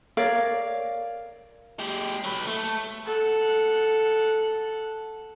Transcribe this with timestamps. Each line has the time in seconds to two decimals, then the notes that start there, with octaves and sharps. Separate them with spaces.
0.17 A#4 C#5 D5 F5
1.79 G#3 G4
2.24 F#3 B4
2.47 A3
3.05 A4 F#5